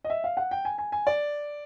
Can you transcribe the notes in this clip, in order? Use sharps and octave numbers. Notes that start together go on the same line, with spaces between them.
D#5
E5
F5
F#5
G5
G#5
G#5
G#5
D5